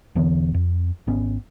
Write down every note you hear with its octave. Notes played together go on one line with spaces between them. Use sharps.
E1 D3 E3 B3
F2
G#1 B3 C#4